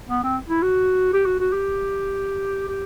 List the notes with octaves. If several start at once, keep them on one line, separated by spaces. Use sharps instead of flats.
B3
C4
E4
F#4
G4
F#4
F#4
G4
G4